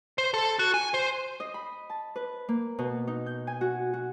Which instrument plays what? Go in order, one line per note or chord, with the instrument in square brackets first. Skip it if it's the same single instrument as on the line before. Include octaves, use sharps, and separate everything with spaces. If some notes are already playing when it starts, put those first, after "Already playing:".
[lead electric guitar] C5
A4
F#4
G#5
C5
[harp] D#5
B5
A5
B4
A#3
B2
D#4
G6
G#5
F#4
F#4